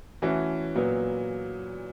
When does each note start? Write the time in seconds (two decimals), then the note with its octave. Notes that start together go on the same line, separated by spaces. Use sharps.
0.22 E3 A3 C#4 E4 F#4
0.75 A#2 F#3 B3